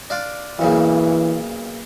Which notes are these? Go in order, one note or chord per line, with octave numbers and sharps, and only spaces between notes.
D4 F4 D5
B1 A#2 C#3 E3